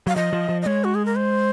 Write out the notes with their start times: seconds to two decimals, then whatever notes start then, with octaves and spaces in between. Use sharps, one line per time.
0.07 F#3 F5
0.16 F3 D#5
0.33 F3
0.49 F3
0.62 D#5
0.66 G#3 C#5
0.84 F#4
0.95 G#4
1.05 A#4
1.16 C5